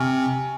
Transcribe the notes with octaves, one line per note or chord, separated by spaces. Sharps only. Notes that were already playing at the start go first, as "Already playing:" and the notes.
Already playing: C3 G#5 C#6 F6